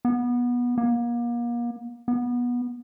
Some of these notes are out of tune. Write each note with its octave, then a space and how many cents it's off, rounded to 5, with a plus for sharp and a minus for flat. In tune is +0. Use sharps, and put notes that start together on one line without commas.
B3 -20
A#3 +35
B3 -20